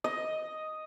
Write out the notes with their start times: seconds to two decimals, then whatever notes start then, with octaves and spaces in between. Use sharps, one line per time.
0.04 D#5